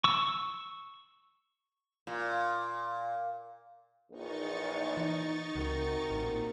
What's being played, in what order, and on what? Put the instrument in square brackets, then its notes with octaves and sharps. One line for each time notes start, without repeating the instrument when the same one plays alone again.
[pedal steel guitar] C#6 E6
[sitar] A#2
[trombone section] A#1 E2 [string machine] D#4 C#6 A6
[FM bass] E3
[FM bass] C#2 [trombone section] C3 F#4 A#4
[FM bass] A1 [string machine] A#2